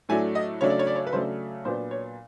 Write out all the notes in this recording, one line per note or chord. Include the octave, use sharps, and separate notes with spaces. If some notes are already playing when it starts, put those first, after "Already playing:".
A2 F#3 A3 D4 G#5
D#5
C#3 F#3 A3 D4 C#5
D5
C#5
D5
C#5
B4
C#3 F#3 A3 D4 C5
A#2 F#3 B3 D4 C5
C#5